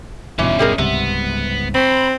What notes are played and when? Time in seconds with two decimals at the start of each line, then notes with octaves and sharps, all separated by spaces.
0.39 D#1 G2 B2 E3 C#4 D#4
0.59 G3 G#4 A#4
0.78 C#2 G#2 C3 G3 B3
1.75 C4 B5 C6